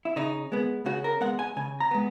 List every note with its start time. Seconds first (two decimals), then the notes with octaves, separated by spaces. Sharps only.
0.05 E4
0.16 C#3 D#4
0.52 G#3 B3
0.86 C#3 F#4
1.04 A#4
1.21 G#3 B3 F#5
1.39 G#5
1.57 C#3 G#5
1.80 A#5
1.91 G#3 B3